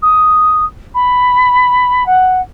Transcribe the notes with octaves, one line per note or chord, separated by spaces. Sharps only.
D#6
B5
F#5